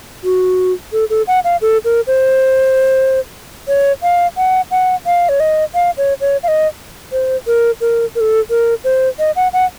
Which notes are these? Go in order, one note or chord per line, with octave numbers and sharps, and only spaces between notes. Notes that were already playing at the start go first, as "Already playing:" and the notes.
F#4
A4
A4
F#5
F5
A4
A#4
C5
C#5
F5
F#5
F#5
F5
C#5
D#5
F5
C#5
C#5
F5
D#5
C5
A#4
A#4
A#4
A4
A#4
C5
D#5
F#5
F#5